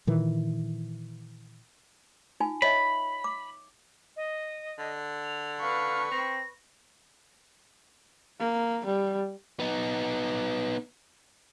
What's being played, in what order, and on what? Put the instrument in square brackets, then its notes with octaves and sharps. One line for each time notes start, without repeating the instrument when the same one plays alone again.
[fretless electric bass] A#2 D#3 E3
[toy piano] D#4 F4 G#5
[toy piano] C#5 D#5 E5 [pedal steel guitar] B5
[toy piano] D6
[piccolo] D#5
[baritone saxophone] D3
[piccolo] F7
[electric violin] B4 C#6 [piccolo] F5
[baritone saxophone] C4 [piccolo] A#6
[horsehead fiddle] A#3
G3
[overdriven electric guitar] B3 D#4